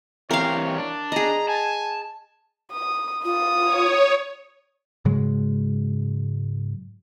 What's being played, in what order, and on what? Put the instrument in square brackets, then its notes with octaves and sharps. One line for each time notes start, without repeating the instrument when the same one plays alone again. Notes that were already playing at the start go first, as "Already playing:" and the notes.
[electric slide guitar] E3 C4 G4 [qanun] A#4 F5 [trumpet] C#5
[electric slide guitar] D4
[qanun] G#4 D#5 [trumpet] A#5
[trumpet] G#5 [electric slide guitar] A5
[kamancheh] D#6
[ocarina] F4 [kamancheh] D#6
[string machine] C#5
[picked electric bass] G#2 C#3 F#3 G#3